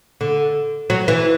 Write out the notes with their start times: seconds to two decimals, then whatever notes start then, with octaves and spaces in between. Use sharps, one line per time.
0.21 D3
0.90 F#3
1.08 E3